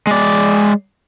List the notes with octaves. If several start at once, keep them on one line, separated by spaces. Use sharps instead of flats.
G#3 D5